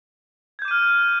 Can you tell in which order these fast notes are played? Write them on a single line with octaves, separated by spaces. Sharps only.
G#6 G6 D6 D#7 F6